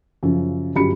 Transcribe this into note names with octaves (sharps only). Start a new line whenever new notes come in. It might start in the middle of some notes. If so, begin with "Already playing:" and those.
F#2 C#3 F3
G1 F#3 C#4 G4 B5 C#7